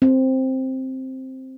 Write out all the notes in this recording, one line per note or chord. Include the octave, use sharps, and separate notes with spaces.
C4